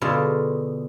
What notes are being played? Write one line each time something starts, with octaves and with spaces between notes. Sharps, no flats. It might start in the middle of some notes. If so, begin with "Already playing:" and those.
B2 D3 F4 G#4 A5